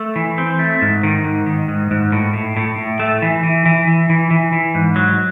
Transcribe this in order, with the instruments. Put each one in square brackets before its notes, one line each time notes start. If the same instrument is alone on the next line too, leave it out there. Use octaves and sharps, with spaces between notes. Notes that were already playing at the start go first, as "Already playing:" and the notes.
Already playing: [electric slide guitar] A3
E3
C4
A3
G#2
D#3
G#2
D#3
G#2
G#2
A2
A2
A2
A2
A3
E3
E3
E3
E3
E3
E3
E3
G#2
F#3